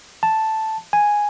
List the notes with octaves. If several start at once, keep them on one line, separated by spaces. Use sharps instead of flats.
A5
G#5